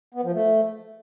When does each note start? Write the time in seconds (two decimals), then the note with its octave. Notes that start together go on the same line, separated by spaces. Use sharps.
0.14 B3
0.24 F3
0.33 A3